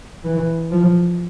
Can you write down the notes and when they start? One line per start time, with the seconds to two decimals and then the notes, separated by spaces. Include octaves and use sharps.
0.24 E3
0.71 F3